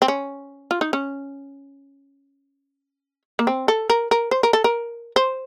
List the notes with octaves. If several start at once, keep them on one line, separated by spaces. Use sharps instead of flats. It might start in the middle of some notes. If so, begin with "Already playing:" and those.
C4
C#4
F4
D#4
C#4
A#3
C4
A4
A#4
A#4
C5
A#4
A4
A#4
C5